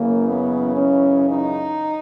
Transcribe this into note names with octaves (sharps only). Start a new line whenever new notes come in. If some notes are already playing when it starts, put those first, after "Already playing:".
Already playing: F#2 C#3 E3 A#3
B3
C#4
D#4